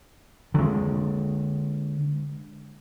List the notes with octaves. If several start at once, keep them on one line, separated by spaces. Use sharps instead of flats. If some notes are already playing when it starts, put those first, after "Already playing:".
D3 G#3